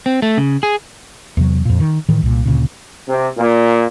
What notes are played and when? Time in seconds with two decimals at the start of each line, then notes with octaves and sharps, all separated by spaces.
0.06 C4
0.22 A3
0.37 C#3
0.63 G#4
1.37 E2 C3 F#3
1.65 F2 A#2
1.80 D#3
2.09 A2 D#3 E3
2.23 C2 A#2
2.46 D2 A#2 C#3
3.09 C3
3.38 A#2